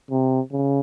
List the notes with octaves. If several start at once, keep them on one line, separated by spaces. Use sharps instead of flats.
C3
C#3